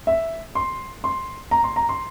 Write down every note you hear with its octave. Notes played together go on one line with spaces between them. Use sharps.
E5
C6
C6
A#5
C6
A#5
C6